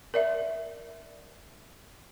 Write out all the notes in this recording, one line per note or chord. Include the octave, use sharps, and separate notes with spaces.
A#4 D5 E5